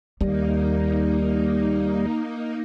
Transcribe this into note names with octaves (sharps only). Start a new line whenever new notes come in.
D#2 G3 A#3 D#4